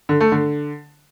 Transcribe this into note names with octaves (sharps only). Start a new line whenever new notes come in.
D3
A3
D3